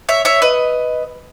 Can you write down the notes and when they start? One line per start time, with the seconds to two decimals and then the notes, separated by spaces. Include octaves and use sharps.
0.09 C#5 E5
0.25 C#5 E5
0.42 B4 D#5